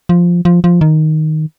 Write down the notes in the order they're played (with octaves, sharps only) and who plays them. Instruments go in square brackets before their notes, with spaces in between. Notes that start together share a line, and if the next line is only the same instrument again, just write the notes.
[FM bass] F3
F3
F3
D#3